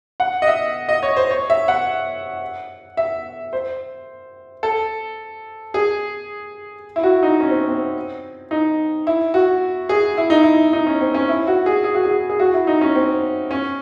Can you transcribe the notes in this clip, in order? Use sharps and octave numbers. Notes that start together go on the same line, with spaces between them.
F#5
D#5
E5
D#5
C#5
C5
C#5
E5
F#5
E5
C5
A4
G#4
E4
F#4
D#4
C#4
C4
C4
D#4
E4
F#4
G#4
E4
D#4
E4
D#4
C#4
C4
C#4
E4
F#4
G#4
G#4
F#4
G#4
G#4
F#4
E4
D#4
C#4
C4
C#4